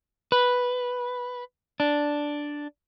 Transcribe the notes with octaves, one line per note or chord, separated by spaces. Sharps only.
B4
D4